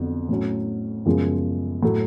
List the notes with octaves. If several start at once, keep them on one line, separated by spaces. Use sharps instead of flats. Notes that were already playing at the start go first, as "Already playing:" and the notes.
Already playing: F2 D3 F#3 B3
A2 F#3 C#4
F#2 C#3 F3 G#3 B3
A2 F#3 A3